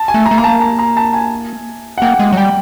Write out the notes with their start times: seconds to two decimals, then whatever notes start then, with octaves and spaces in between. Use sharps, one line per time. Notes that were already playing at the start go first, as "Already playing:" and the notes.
Already playing: A5
0.08 G#5
0.14 A3
0.26 A#5
0.31 A3
0.38 A#3 A#5
0.44 A5
0.61 A#5
0.79 A#5
0.97 A5
1.14 G#5
1.98 F#5
2.02 A#3 G5
2.19 G#3
2.33 F#3
2.37 G3 G5